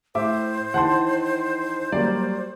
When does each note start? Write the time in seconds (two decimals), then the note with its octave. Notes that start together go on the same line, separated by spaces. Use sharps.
0.15 A2 C5 E5 D6
0.74 D#3 E3 F#5 A5 C6
1.92 F#3 G3 A#3 D5